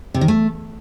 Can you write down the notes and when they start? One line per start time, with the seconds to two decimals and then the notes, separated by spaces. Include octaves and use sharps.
0.14 C3
0.21 D#3
0.28 A3